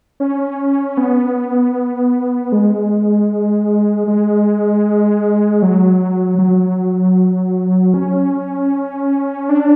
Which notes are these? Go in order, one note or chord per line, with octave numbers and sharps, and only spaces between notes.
C#4
B3
G#3
G#3
F#3
F#3
C#4
D4